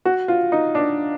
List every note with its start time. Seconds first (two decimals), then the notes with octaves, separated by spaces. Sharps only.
0.05 F#4
0.28 F4
0.52 D#4
0.75 D4